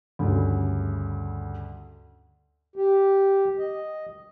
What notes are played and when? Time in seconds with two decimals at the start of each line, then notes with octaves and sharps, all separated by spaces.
0.19 D2 G2 C#3
2.76 G4
3.58 D#5